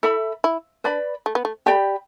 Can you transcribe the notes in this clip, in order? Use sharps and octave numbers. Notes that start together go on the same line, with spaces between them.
E4 A4 E5 B5
E4
D4 B4 D5 B5
A3
B3
A3
A3 G4 D5 G5 B5